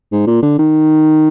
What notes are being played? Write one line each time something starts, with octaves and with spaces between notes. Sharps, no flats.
G#2
A#2
D3
D#3